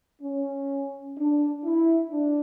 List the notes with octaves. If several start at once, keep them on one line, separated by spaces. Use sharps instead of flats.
C#4
D4
E4
D4